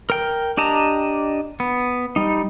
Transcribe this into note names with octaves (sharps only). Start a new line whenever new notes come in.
A#4 G5
D4 G4 D#5 A5 A#5
B3
G3 D#4